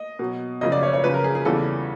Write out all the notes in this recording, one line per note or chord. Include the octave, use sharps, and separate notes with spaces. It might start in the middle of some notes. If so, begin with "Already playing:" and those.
Already playing: D#5
B2 F#3
F#2 C#3 F3 D#5
D5
C#5
C#5
F#2 C#3 F3 B4
A#4
G#4
G#4
E2 C#3 E3 G3 A4